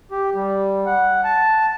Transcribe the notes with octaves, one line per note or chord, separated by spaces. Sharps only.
G4
G3
F#5
A5